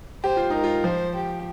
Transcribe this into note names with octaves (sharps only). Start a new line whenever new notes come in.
G4 C5
F4
D#4 A#4
F4
F3 C5
G4